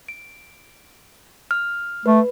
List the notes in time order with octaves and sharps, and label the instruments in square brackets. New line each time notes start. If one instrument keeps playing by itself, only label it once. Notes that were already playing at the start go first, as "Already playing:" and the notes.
[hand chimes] D7
F6
[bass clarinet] A3 [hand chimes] B4